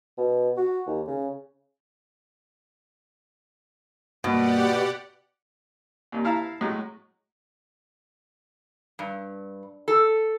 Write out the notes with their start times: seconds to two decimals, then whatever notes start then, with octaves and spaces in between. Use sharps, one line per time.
0.18 B2
0.57 F#4
0.86 D#2
1.07 C#3
4.24 G2 B2 A#3 G4 D5 F#5
6.12 D#2 A#2
6.25 E4 F5 A5 A#5
6.61 A2 F#3 G#3
8.99 G2
9.88 A4